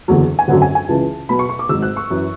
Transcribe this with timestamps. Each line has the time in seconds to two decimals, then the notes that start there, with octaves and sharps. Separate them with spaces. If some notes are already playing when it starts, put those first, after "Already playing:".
0.08 F#1 E2 D3 F#3
0.39 G#5
0.48 G#1 F#2 D3 F#3 F#5
0.62 G#5
0.75 G#5
0.89 C#2 C#3 E3 A5
1.29 B1 B2 F#3 B5
1.39 C#6
1.49 C#6
1.59 D6
1.69 G#1 G#2 F#3 E6
1.82 F#6
1.96 C#6
2.10 F#2 E3